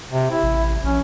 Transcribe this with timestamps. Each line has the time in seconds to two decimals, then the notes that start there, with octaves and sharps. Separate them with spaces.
0.11 C3
0.31 E4
0.43 A1
0.84 A#1 C#4